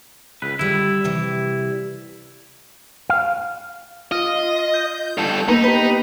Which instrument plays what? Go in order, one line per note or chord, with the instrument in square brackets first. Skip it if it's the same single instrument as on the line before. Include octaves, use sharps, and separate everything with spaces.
[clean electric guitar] C#2 B4
[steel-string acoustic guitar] D3 G3 [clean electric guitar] E4
[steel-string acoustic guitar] C3 E3 G3
[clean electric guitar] F5
[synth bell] F4 [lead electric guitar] D#5
[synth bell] G6
[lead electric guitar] G2 A4
[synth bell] A#3 B3 B4 [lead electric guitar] D#4
[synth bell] G4 B4